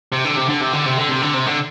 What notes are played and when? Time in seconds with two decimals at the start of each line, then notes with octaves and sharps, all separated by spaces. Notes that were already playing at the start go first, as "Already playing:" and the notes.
0.12 C3
0.25 D3
0.36 C3
0.49 D3
0.61 C3
0.73 D3
0.86 C3
0.97 D3
1.09 C3
1.22 D3
1.34 C3
1.46 D3